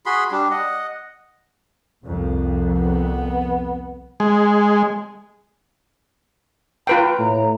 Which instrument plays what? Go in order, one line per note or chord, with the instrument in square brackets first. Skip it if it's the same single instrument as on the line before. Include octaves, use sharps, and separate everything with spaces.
[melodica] F#4 G#4 B5 C6
G3 D4
D#5 F#5
[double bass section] C2 F2
[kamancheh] B3
[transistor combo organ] G#3
[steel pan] F4 B4 G5 [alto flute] A#5
[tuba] A2